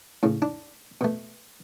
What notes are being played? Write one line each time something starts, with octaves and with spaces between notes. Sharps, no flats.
A2 C#3
D4
B2 A3